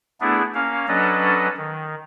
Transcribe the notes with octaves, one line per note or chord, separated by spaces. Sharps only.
A3 B3 D4 E4 G#4
A#3 C#4 F5
F#3 C#4 D4 A4 B4 D#5
D#3